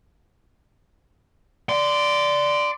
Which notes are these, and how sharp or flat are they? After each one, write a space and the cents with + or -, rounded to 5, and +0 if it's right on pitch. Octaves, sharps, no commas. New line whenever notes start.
D5 +0 C6 -20